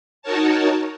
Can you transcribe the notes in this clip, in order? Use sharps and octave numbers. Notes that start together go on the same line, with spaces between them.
D#4 F#4 A#4 C#5 A5